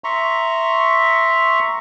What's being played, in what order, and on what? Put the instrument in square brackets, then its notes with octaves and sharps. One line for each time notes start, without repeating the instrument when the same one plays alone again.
[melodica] E5 A#5 C6 C#6